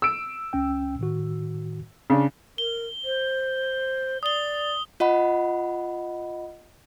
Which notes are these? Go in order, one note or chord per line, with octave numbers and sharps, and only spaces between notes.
E6 D7
C#2 C#4 G5
A2 D#3 F#4
C#3 D4
A#4 G7
C5
D5 D#6 G7
F4 D#5 F#5 B5